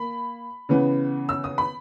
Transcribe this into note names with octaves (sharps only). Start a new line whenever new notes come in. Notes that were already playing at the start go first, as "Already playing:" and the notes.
Already playing: A#3 B5
C#3 E3 B3
E6
D#6
B5